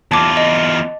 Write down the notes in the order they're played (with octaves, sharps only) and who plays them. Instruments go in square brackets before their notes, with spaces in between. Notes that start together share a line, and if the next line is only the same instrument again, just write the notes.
[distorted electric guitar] E2 F4 [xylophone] A5 D6
[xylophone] D#5
A6